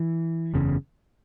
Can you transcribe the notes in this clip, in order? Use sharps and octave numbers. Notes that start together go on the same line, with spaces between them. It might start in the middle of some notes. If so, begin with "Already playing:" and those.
Already playing: E3
F#1 E2 C#3